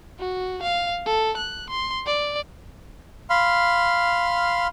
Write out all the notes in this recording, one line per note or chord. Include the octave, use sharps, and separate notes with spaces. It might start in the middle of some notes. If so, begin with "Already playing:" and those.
F#4
F5
A4
F#6
C6
D5
F5 B5 C6 F6